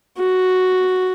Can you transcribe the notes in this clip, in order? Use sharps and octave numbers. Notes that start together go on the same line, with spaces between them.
F#4